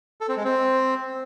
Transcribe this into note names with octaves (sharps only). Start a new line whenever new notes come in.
A4
C4
G#3
C4